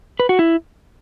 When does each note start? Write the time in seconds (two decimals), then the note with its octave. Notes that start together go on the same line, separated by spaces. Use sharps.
0.20 B4
0.29 F#4
0.39 E4